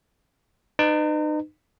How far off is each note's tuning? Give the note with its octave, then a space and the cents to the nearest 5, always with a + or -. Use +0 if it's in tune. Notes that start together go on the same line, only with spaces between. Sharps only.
D#4 -35 B4 +25